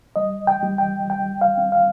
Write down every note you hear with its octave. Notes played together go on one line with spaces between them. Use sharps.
G3 D#5
G5
G3
G5
G3 G5
F5
C4
F5